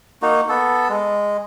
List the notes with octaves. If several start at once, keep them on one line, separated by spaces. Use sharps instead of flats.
A#3 D#4 F#4
B3 A4
G#3